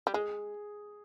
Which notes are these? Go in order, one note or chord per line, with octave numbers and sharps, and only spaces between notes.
G3
G#3 G#4